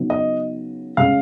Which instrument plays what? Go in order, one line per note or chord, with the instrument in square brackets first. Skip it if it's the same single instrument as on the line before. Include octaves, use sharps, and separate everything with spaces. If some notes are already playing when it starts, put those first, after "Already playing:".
Already playing: [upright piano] C#3 F#3 B3 D#4
[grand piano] D#5
[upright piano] C#3 G#3 C#4 [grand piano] F5